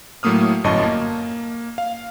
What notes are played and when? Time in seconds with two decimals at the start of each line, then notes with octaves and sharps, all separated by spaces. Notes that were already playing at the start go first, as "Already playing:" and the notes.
0.23 A2 F#3 A3 A#3 D#6 F6
0.64 G1 F#2 A2 D#5 A5 C#6
0.83 A#3
1.78 F5